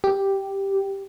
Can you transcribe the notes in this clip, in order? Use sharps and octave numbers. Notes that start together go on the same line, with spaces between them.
G4